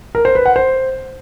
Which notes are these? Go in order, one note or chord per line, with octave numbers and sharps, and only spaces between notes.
A#4
C5
B4
F#5
C5